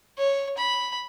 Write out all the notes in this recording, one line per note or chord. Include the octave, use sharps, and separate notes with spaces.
C#5
B5